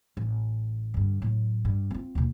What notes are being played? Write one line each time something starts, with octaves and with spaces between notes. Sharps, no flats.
A1
G2 D3
A2 F#3
G2
C4 F4
D#2 B2